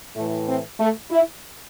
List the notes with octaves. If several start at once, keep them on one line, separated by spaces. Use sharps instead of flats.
A2 E3 A3
C4
A3
E4